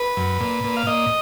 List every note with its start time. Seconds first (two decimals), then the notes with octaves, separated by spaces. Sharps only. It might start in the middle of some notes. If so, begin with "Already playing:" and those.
Already playing: B4
0.17 F#2
0.40 A#2
0.64 A#2
0.77 F5
0.87 A#2 D#5